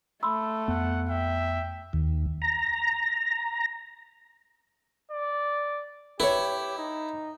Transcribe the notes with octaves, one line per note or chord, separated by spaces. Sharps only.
A3 B5 C6 E6
F2 B3 F#5
E5 G5
D#2
A#5
D5
E4 G4 B4 C#5
D#4